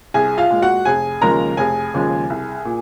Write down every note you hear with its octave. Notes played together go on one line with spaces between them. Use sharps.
C2 G#4 G#5
F4 F5
A#2 G#3
F#4 F#5
F1 G#4 G#5
D#2 C#3 F3 G#3 A#4 A#5
F1 G#4 G#5
D#2 C#3 F3 G#3
C2
A#2